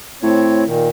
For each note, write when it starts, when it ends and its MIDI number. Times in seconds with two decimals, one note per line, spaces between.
0.22 0.65 45
0.22 0.64 60
0.22 0.64 73
0.65 0.89 46
0.65 0.89 51